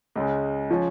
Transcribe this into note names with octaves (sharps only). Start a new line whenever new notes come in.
C#2 C#3 G#3
F3 C#4